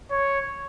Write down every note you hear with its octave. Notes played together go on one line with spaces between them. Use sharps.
C#5